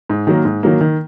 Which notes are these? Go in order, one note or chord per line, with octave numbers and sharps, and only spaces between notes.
G#2
D#3 F#3 A#3
G#2
D#3 F#3 A#3
D#3